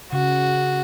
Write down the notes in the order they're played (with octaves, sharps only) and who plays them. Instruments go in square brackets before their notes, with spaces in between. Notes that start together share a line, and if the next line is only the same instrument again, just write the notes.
[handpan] C#3 [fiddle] F#4